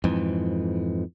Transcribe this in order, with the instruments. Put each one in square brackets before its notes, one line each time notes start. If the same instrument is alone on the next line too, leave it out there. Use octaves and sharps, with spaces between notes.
[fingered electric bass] F2 G#2 E3